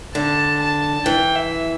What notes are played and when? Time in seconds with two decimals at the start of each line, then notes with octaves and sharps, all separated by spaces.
0.15 D3 A5
0.60 A5
1.06 E3 G5
1.36 E5